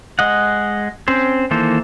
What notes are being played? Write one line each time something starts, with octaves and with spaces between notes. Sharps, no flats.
G#3 D#5 F#5
C4 C#4 C5
D#3 E3 A#3 A4 C5